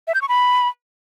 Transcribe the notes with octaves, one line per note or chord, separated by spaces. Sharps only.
E5
G6
C#6
B5